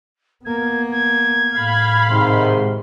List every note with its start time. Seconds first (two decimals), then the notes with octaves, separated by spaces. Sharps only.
0.45 A#3 B3 G#6
0.92 G#6
1.54 A2 F5 B5
2.09 G#2 C3 D#3 C6